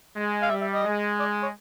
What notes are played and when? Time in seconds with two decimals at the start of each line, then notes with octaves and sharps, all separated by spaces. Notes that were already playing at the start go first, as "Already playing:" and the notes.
0.15 G#3
0.42 F5
0.49 G3 E5
0.61 E5
0.72 D#5
0.84 G#3
1.19 D5
1.42 C#5